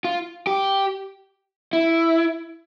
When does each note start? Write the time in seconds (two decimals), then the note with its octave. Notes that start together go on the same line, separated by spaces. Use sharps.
0.05 F4
0.47 G4
1.73 E4